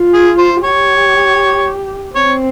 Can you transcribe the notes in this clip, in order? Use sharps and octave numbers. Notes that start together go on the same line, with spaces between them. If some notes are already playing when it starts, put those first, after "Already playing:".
Already playing: F4
G#4
C5
G4 C#5
C4 C#5